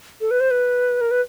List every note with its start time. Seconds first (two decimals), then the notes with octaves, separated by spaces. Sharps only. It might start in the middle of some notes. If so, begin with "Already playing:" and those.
0.21 A4
0.31 B4
0.40 C5
0.51 B4
1.01 A#4
1.11 B4